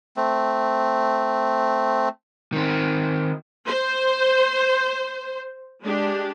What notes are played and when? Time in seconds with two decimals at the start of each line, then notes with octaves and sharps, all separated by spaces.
0.16 A3 C4
2.52 D#3 C4
3.66 C5
5.82 G#3 D4 G4